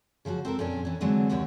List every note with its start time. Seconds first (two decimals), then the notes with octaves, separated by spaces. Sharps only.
0.25 C#3 F3 F#3 F#4
0.45 C4 A4 A#4
0.59 F2 A#2 C#4 D4
0.85 E3 C#4
1.01 D3 E3 F#3 G#3 C4 D4
1.30 D#2 C3 G3 C#5 F#5